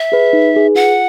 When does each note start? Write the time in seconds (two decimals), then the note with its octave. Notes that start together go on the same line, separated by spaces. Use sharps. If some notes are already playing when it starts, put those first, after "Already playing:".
Already playing: E5
0.12 G#4 B4
0.33 D#4
0.54 G#4 B4
0.75 F4 F#5